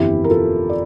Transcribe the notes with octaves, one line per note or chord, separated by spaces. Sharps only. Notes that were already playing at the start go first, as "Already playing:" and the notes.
Already playing: G1 F2 E3 E4 G4
A#4
F4 A4
D5